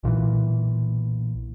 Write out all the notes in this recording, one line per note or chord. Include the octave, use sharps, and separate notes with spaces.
B1 A#2 D3 E3